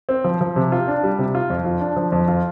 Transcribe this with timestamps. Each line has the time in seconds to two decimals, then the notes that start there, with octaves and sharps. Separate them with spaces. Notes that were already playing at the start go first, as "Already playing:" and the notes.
0.09 C4
0.24 F3
0.41 F3
0.56 C3
0.72 F4
0.88 D4
1.03 G3
1.19 C3
1.35 F4
1.50 F2
1.65 F4
1.80 D4
1.96 F3
2.12 F2
2.28 F4